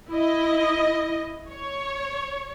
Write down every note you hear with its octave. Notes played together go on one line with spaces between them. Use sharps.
E4 D#5
C#5